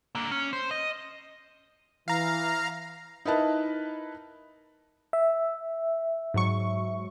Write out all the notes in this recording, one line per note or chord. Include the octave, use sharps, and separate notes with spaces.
D3 A#3
C#4
C5
D#5
E3 F5 A#5
D#4 E4 A#4 B4 D#5 A5
E5
G#2 F#3 C#6